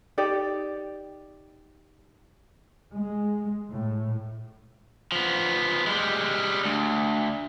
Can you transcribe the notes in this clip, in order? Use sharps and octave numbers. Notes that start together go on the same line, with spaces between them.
D#4 G4 D5
G#3
A2
F3 B3
G3 G#3
D2